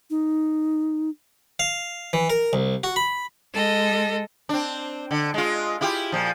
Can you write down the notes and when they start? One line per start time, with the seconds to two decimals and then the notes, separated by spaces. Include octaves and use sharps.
0.10 D#4
1.59 F5
2.13 E3
2.30 A#4
2.53 C2
2.84 F#4
2.96 B5
3.55 G#3 A4 D#5
4.49 C4 D4
5.11 D3
5.34 G#3 F4
5.81 E4 F4 G4
6.12 A#2 F3